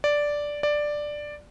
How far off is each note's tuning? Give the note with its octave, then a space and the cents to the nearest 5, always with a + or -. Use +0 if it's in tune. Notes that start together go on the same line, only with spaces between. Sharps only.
D5 -5
D5 +5